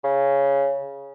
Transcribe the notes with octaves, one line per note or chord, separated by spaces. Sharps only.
C#3